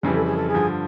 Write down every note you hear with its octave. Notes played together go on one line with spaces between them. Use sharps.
F2 C#3 E3 G3 G#4
A4
G#4
A4
G#4
G2 D3 F3